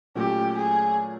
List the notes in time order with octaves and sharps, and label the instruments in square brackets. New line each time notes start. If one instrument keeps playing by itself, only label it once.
[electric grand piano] A#2 F#3 A3 C#4 [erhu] G4
[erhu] G#4